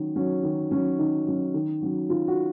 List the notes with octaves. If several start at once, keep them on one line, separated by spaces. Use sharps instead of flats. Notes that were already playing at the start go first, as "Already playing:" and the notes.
Already playing: D#3 F#3 C#4
F#3 C#4
D#3
F#3 C#4
D#3 D#4
F#3 C#4
D#3
F#3 C#4
D#3 F4
F#4